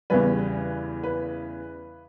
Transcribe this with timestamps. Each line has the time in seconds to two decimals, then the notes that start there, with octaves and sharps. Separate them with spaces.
0.10 E2 C#3 E3 G3 B4
1.04 B4